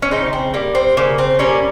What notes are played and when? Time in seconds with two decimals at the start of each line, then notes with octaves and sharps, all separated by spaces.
0.02 C#4
0.11 C#3 C4 D#4
0.33 C4
0.54 G3 A#3
0.75 C4
0.97 C#3 A#3
1.18 C4
1.39 G3 A#3 C#4